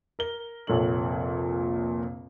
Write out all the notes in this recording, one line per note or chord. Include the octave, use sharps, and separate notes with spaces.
A#4 G7
F1 A#1 A#2 A4 C#5 F#7